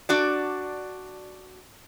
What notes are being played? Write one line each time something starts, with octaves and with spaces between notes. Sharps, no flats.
D4 F#4 D5